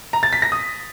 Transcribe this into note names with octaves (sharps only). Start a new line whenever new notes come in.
A#5
A6
B6
A#6
D#6